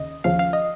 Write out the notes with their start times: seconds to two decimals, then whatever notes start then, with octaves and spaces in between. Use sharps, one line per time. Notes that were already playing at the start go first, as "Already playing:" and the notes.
Already playing: D#2 C#3 D#5
0.24 D#2 C#3 F3 F5
0.39 F5
0.53 D#5